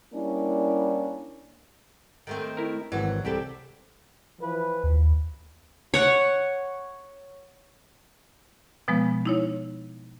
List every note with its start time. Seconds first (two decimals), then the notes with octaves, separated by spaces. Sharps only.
0.14 G3 A#3 C#4 D4 E4
2.27 D#3 A3 C4
2.57 E4 A#4
2.92 G#1 E3 F#3
3.25 C2 C4 G4 A4
4.40 E3 F3 B4
4.84 D#2
5.94 C#5 F#5 C#6
8.88 B2 F3 G#3 B3
9.25 D#4 E4 C#5